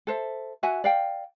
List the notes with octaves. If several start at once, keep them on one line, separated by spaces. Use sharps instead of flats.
A4 C5 E5
F#4 E5 F#5 G#5
D5 F5 G5